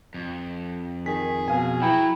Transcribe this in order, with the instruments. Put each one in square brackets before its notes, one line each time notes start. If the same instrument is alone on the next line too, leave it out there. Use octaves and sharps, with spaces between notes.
[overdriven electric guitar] F2
[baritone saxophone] D#3 [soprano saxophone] G#4 [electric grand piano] B6
[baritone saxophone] B2 [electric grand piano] F5 G#5
[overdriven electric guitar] F#3 [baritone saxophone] E4 [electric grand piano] G5